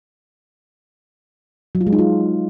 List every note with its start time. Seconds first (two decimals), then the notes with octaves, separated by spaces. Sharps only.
1.75 F#3
1.81 F4
1.87 G#3
1.93 D#4
1.99 F4